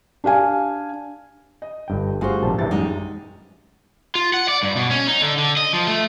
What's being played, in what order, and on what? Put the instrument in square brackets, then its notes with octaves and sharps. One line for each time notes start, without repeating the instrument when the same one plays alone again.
[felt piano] D4 G4 F5 G#5
D#5
[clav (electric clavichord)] G1 G2 G5
[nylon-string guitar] G3 C5 [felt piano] A3 F4 F#4 [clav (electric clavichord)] G#4
[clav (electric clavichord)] A#1 G#2 C3 [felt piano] A5
[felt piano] A1 D4 A6 [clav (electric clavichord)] E3
[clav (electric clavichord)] F#2 [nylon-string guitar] G3 G#3 D#4
[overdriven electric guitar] F4
F#5
D5
G2
B2
C#4
D#4
D3
D3
D#5
F3
A3